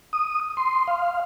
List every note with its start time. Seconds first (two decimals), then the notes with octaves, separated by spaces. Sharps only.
0.13 D#6
0.57 C6
0.88 F5